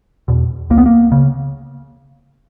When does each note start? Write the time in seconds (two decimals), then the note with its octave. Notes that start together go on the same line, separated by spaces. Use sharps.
0.28 E2 B2
0.70 C#2 A#3
0.78 B3
0.86 A#3
1.12 C#3